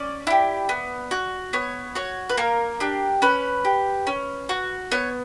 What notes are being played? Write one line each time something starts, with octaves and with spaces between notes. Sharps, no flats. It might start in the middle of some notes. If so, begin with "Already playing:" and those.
Already playing: C#4 D5
E4 G4
B3
F#4
B3 C#5
F#4 C#5
B4
A#3 A#4
D4 G4
C#4 B4
G4
C#4
F#4
B3 C#5